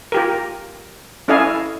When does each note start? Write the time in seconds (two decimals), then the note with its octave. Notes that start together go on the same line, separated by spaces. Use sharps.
0.12 F4 G4 A#4
1.28 C#4 E4 A4 D#5 F5 G#5